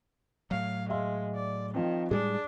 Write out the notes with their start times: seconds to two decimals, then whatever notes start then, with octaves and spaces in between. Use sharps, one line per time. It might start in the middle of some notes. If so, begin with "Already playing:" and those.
0.51 A2 F#3 F5
0.90 G#3 E5 F5 C6
1.35 D5
1.74 D#3 F3 C4
2.11 A2 G3 G#3 D4 G#4